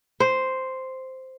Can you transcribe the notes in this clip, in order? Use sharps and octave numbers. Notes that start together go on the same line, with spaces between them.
C5